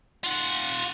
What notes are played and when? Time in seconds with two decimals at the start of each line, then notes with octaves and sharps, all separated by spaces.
0.24 F4 F#5